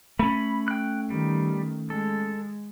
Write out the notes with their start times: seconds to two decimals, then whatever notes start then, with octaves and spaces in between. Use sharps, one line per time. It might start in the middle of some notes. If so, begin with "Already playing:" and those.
0.19 A3 C#4 B5
0.68 G5 F#6
1.10 D#3 G3
1.90 G#3 A4